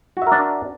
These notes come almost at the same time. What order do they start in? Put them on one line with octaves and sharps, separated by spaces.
F#4 E5 A#4 D4